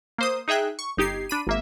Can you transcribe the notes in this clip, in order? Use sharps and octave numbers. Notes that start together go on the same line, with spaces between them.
A#3 C5 D#6
D#4 G#4 E5 G5 F#6
C#6
G1 D#4 G4 G#6 C7
D4 B5 D#7
G#1 A#3 E5